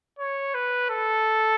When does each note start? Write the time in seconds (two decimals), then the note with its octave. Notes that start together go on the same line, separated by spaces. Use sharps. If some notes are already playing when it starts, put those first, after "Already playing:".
0.19 C#5
0.54 B4
0.89 A4